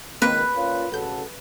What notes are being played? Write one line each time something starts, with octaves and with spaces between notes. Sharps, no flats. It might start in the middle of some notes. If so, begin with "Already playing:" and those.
C#2 D#3 A#3 C4 A#4 B4
A#2 C#4 F4
A1 C#3 F#4 A4 G6